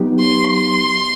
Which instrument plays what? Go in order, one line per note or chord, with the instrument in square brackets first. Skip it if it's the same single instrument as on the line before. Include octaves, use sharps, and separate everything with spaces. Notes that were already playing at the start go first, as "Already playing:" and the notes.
Already playing: [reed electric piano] F#3 B3 D#4 G4
[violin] C6
C6